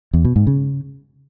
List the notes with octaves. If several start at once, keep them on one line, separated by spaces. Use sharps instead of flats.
E2
B2
G#2
C#3